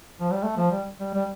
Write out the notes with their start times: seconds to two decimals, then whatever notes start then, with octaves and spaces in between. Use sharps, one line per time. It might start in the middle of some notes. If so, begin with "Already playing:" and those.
0.20 F3
0.32 G3
0.44 A3
0.58 F3
0.72 G3
1.00 G3
1.14 G3